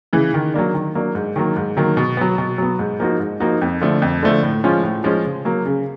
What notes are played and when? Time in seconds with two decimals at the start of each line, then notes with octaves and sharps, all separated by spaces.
0.13 C#3 E3
0.34 D#3
0.54 F#3 A#3 D4
0.74 D#3
0.95 F#3 A#3 D4
1.15 G#2
1.36 D#3 F#3 A#3
1.56 G#2
1.77 D#3 F#3 A#3
1.97 B2
2.17 F#3 B3
2.38 B2
2.58 F#3 B3
2.79 G#2
3.00 F3 A#3 D#4 F#4
3.20 G#2
3.40 F3 A#3 D#4 F#4
3.62 F2
3.81 D3 F3 A3
4.02 F2
4.23 D3 F3 A3
4.43 A2
4.64 F3 G#3 C#4 F4
4.83 A2
5.04 F3 G#3 C#4 F4
5.24 C#3
5.45 F#3 A#3
5.66 C#3